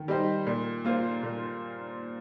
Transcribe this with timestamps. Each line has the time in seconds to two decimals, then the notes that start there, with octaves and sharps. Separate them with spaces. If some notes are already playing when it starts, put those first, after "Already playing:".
Already playing: D#3
0.08 G3 D#4 C5
0.47 A#2
0.85 A#3 F4 C5
1.23 A#2